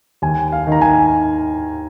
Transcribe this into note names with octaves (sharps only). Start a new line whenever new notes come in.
D#2 G#5
F5
D#3
A#5
G#5